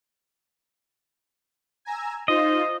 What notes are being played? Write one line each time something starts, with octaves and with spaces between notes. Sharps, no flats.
G#5 A#5 E6
D#4 F4 C5 D#5